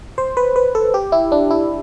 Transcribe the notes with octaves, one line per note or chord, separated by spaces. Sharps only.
C5
B4
B4
A4
G4
E4
D4
E4